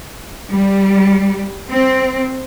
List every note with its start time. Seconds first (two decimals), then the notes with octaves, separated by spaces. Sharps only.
0.51 G3
1.70 C4